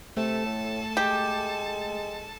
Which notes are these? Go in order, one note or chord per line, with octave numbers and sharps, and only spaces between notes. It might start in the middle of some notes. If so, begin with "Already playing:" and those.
C3 A3 A4 A5
A2
G#3 G4